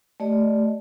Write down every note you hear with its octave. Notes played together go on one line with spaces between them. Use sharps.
A3 G4 D5 D#5